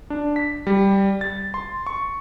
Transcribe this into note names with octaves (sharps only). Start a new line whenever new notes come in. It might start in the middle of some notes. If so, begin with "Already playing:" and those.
D4
B6
G3
A6
C6
C#6